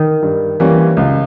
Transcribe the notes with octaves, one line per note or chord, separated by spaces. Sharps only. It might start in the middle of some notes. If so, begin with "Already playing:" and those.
Already playing: D#3
G2
E3 G3 A#3 C#4
C#2